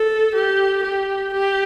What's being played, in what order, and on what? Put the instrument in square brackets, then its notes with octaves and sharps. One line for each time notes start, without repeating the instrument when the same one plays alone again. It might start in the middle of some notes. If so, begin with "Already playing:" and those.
Already playing: [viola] A4
G4
G4
G4